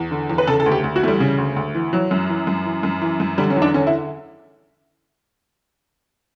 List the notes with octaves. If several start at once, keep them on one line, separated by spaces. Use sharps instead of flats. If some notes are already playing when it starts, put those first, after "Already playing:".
Already playing: E2
D3
E2
B4
C#3 A4
A4
D2
G4
D2
F#4
E3 A3
G3
C#3
D2
D2
E3
E3 F#3
F#2
E3
F#2
E3
F#2
E3
F#2
D3 G3
C#4
E2
D4
D3 C#4
E4